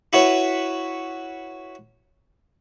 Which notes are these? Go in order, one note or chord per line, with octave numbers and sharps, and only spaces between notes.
E4 F#4 B4 C#5